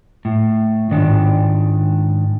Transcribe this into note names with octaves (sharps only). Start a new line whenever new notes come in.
A2
G#2 D#3 D4